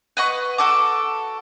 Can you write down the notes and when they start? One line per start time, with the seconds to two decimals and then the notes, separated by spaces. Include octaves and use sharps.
0.17 B4 D#5 F#5 C#6
0.58 F#4 A4 D6